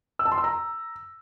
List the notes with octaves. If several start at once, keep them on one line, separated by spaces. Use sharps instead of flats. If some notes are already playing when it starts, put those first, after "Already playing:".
E6
A5
C6
E6
A#5